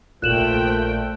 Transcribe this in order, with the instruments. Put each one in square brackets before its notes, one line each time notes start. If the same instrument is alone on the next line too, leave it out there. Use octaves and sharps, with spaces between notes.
[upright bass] A#1 [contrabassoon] A#2 [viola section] F3 A3 G5 [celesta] F#6 E7 F#7